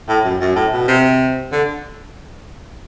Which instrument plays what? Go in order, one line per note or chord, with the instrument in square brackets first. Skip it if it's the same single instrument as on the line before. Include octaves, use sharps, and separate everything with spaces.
[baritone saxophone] A2
F#2
F#2
A2
B2
C3
D3